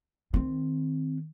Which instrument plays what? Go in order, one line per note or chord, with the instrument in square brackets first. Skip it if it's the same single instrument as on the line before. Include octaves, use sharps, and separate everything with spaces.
[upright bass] D#3 C4